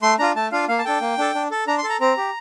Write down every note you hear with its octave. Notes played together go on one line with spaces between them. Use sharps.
A3 C6
D4 F4 A#5
A3 A5
D4 F4 F5
A#3 F5
A5
D4 A4 G5
A#3
D4 A4
D4
A4
D4 A#5
C6
A4
A#5
C4 A#5
G4